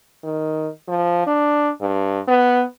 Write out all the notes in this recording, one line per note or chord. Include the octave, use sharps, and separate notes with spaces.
D#3
F3
D4
G2
B3